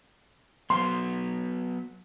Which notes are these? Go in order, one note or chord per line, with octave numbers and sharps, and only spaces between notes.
F#3 B3 C6